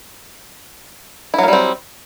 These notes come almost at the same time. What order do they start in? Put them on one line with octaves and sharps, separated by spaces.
E4 F#3 A#3 G3 C4